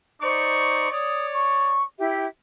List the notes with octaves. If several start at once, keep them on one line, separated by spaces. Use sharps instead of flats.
D#4 C5 D5 C#6
C#5 D5 D#6
C#6
E4 G4 E5